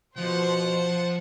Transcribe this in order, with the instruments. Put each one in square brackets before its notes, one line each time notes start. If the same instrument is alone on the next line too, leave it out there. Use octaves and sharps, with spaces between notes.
[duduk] B2 [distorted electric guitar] F3 [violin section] C5 [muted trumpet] F#5